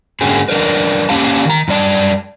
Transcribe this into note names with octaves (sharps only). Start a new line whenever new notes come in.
G#2 D3 A#3 C#4 F#4 G#4
F#3 D4 A#4 B4
A#3 C#4 G4 F5 A5
D#3 A#5
F#2 G3 D5 A5